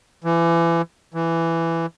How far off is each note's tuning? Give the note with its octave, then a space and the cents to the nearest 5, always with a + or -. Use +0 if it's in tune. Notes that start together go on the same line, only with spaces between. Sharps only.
E3 +30
E3 +10